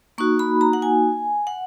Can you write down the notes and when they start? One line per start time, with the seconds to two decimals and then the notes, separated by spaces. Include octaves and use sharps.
0.18 A#3 D#4 F#4 C#6
0.39 B5
0.61 A#5
0.73 F#5
0.82 G#5
1.47 F#5